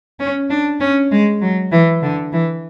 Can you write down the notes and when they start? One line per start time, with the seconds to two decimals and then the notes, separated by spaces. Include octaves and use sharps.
0.19 C#4
0.50 D4
0.80 C#4
1.11 G#3
1.42 F#3
1.72 E3
2.03 D3
2.32 E3